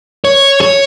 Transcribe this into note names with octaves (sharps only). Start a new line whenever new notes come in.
C#5
C#5